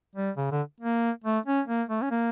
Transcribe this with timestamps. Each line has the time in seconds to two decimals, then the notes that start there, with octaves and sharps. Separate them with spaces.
0.16 G3
0.37 C#3
0.52 D3
0.80 A#3
1.24 A3
1.46 C#4
1.68 A#3
1.89 A3
2.02 C#4
2.11 A#3